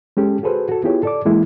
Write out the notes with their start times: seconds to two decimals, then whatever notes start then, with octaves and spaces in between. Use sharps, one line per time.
0.17 G#3 C#4 G4 A4
0.43 F#4 G#4 A4 B4 C5
0.69 F#4 A4
0.84 B3 E4 F4 G4 G#4 C#5
1.03 A4 D5 D6
1.25 E3 G#3 A#3 E4